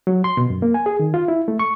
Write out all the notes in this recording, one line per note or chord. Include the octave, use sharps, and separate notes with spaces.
F#3
C6
B2
F#2
A#3
G#5
G#4
D#3
F4
E4
A3
C#6